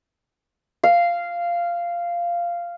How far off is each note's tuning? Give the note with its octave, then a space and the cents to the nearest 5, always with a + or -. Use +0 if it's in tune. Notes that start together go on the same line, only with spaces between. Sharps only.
F5 -10